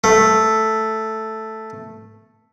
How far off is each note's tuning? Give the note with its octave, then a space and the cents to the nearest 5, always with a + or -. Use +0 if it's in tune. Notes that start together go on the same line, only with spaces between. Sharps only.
A3 +0